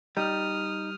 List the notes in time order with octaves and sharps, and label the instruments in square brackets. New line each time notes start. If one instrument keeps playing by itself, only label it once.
[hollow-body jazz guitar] G3 [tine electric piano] D#4 [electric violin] D#6 F6